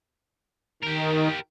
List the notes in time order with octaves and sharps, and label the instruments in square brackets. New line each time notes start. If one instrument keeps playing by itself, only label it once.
[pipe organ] D#3 [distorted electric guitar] G4 A#4